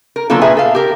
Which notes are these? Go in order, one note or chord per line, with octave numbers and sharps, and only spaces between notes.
A#4
D3 F#3 A#3 B3 F4 A4
A#2 G#4 B4 E5 G#5
A4 F5
G4 A#4